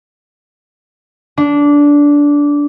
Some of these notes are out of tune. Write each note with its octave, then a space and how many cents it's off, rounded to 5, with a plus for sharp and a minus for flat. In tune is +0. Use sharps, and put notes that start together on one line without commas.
D4 -15